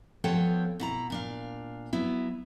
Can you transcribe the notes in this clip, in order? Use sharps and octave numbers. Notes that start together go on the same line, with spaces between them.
F3 B3 A4 C5 C#5 G5
B2 E4 A#5
A#2 D4 F5
F#3 B3 E4